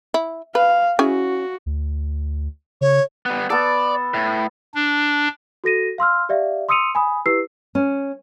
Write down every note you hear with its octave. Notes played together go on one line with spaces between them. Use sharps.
E4
B4 F5
C#4 E4 F#4 G#4
D2
C#3 C#5
G3 B3
B3 A4 D5
A2
D4
F#4 A4 A#6 D#7
F5 C6 E6 F6
G4 D5 E5 F5
C6 D#6 E6 C#7 D#7 F7
G#5 B5 D#6
E4 G4 B4 E6 C7
C#4